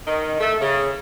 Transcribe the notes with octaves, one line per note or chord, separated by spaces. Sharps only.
D#3
A3
C#3